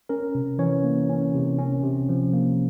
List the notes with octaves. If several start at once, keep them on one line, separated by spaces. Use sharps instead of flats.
C#4 A#4
C3
E3 C#4 C#5
A#3
C#4
C3
C#4
C3
F3
A#3